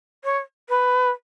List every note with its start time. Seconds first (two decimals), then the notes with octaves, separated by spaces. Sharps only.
0.24 C#5
0.69 B4